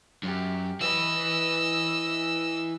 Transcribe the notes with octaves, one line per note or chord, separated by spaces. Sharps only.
F#2 G4
E3 B4 D#5 E6